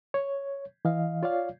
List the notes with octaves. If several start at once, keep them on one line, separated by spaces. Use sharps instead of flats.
C#5
E3 D#5 F5
F4 C#5 D5 F5